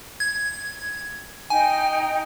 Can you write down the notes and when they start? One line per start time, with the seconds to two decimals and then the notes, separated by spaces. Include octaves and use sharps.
0.20 G#6
1.50 D#4 G5 G#5